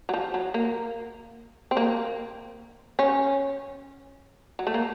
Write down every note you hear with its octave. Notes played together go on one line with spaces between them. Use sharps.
F#3
F3
F#3
A#3
C4
A#3
C#4
F#3
A3
A#3